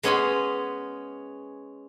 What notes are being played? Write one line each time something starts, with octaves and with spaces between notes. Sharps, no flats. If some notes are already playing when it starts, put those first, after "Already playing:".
G#3 B3 C#4 G#5 B5 C6